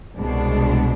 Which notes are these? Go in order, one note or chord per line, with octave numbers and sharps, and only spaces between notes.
C2 B2 G#3 D4